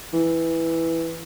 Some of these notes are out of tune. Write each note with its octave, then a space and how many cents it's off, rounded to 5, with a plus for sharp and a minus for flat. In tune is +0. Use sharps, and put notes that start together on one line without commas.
E3 -5